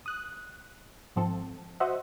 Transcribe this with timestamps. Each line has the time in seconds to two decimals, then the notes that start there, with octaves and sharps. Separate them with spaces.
0.06 D#6 F#6
1.16 G#1 G#2 F3 C4 A4
1.80 F#4 C5 D#5 E5 F#5